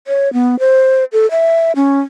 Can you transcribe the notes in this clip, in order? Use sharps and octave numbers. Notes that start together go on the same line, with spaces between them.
C#5
B3
C5
A4
E5
C#4